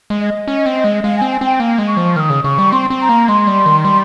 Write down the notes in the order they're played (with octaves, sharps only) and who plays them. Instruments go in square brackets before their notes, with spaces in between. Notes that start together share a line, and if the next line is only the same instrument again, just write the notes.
[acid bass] G#3
[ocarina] D#5
[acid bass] C#4
C4
G#3
[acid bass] G#3 [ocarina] F5
[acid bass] C4 [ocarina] G#5
[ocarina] G#5
[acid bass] C4 [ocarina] G5
[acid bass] A#3
G#3
[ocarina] C#6
[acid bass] F3
[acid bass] D#3 [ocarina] D#6 F6
[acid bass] C#3
[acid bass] C#3 [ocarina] C#6
[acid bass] G3
[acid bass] C4 [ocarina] C6
[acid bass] C4
[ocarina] A#5
[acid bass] A#3
[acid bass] G#3 [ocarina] C6
[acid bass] G3
D#3
G3